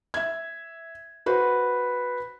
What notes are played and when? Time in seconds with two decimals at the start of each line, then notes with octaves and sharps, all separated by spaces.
0.14 E5 G#6
1.26 F#4 B4 C5